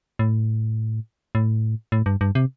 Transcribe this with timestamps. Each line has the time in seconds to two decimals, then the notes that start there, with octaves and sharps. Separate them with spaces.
0.19 A2
1.35 A2
1.92 A2
2.06 G2
2.21 G2
2.35 C3